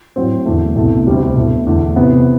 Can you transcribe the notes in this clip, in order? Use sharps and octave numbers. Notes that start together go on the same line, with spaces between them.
A2 F#3 C4
E2 D3 A3
C2 B2 A3
D2 C3 G3
B2 A3 E4
E2 D3 A3
C3 E3 B3